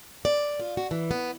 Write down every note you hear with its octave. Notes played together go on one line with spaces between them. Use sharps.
D5
F4
F#4
E3
B3